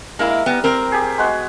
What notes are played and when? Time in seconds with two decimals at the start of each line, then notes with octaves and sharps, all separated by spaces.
0.19 G#3 A#3 E4 A#4
0.46 G3 B3 A#5
0.64 C4 A#4
0.92 G4 G#4
1.18 G#3 B3 F#4